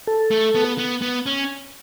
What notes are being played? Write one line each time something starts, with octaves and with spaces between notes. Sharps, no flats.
A4
A3
B3
B3
B3
C#4